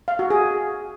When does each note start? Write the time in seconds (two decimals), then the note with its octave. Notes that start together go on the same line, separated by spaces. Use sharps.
0.08 F5
0.19 F#4
0.30 G#4